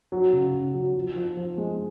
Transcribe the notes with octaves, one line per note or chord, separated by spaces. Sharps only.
F#3
C#3
C#3
F#3
F3
F3
F3
G#3